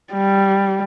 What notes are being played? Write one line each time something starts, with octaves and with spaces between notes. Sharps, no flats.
G3